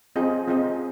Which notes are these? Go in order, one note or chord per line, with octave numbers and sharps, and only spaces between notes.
C4 F4 G#4 D#5
C4 F4 G#4 D#5